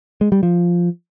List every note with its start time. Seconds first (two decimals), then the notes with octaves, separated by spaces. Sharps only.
0.21 G#3
0.32 G3
0.43 F3